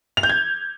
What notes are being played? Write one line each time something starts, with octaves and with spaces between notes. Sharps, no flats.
F7
G6
G#6